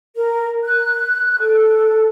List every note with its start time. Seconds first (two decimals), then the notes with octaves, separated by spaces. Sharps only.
0.16 A#4
0.64 F#6
1.40 A4